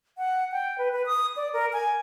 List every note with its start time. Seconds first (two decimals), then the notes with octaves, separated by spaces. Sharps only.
0.18 F#5
0.52 G5
0.78 B4
0.92 B4
1.06 D#6
1.36 D5
1.53 A#4
1.73 G#5